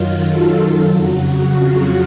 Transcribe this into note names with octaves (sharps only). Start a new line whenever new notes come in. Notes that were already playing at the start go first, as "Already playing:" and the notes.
Already playing: F#2 D#3 F#3 F4
A4
F2 C#3 F#3 F#4
F4